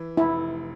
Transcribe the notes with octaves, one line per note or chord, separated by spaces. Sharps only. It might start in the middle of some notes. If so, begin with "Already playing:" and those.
Already playing: E3
F1 E4